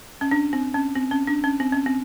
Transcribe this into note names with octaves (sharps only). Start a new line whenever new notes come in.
C#4
D4
C4
C#4
C4
C#4
D4
C#4
C4
C#4
C4